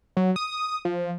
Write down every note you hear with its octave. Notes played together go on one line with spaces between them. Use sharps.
F#3
D#6
F3